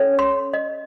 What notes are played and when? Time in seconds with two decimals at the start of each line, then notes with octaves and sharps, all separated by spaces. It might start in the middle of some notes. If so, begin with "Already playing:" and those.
Already playing: C#4 A4 C#5
0.19 C6
0.53 D#5